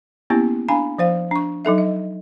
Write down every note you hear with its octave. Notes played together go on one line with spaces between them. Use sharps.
A#3 B3 C#4 E4 G4
D4 F5 G#5 B5
F3 C5 F5
D4 C#6
F#3 D#4 A4 E5
D#5